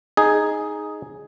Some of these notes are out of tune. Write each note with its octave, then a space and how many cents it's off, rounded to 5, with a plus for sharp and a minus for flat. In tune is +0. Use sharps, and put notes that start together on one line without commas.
D#4 +0 G#4 +5